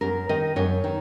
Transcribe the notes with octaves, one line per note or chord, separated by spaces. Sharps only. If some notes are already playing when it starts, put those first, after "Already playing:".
F#2 A#4
D#3 D#5
F#2 C#5
D#3